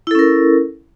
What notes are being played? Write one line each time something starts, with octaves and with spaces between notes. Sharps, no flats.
C#4 E4 A4 A#4